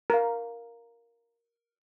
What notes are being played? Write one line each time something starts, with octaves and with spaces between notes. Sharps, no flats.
A#4 F5